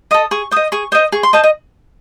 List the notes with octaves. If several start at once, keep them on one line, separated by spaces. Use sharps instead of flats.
A4 D#5 D#6
G#4 C#6
C5 D#5 D#6
G#4 C#6
C5 D#5 D#6
G#4 C#6
C6
C5 D#5 A5
D#5